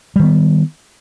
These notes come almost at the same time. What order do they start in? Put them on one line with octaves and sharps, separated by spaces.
G3 D#3 B3